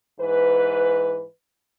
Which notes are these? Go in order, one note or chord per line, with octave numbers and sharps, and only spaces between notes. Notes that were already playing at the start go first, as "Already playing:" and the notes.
G#2 E3 B4